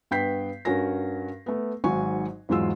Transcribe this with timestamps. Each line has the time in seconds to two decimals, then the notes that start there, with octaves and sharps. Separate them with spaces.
0.11 G2 B3 G5 G6 B6 C7
0.65 G2 C#4 F#4 A#4 G#5 A#6
1.46 A3 B3
1.84 G#1 G#2 F#3 F#4 G#5 C#6
2.49 E2 G#2 F#3 G#3 F4 E6